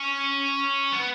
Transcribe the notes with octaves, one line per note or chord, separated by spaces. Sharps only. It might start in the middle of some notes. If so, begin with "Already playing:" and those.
Already playing: C#4
B3